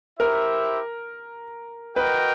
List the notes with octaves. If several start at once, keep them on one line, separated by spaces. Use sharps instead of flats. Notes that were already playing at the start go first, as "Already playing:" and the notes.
E4 G4 A#4 C5 E5
F#4 A#4 B4 D#5 G5